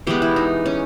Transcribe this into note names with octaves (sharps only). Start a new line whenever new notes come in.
E3 G#3 B3 G4
E4
D#4
C#4